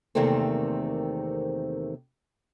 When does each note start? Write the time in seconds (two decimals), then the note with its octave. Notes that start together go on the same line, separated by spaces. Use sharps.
0.15 E2 C3 D#3 A3 A#3 C4